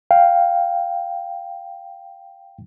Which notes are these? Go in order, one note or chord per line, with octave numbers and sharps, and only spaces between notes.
F5 G5